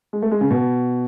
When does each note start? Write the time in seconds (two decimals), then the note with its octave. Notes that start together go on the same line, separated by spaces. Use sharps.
0.13 G#3
0.22 A3
0.32 G#3
0.41 C#3
0.51 B2